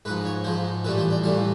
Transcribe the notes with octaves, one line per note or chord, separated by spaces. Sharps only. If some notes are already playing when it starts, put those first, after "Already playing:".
G#2 F3 B4
C#5
G#2 F3 C5
A2 E3 G3 B4
C5
D5
A2 E3 G3 F5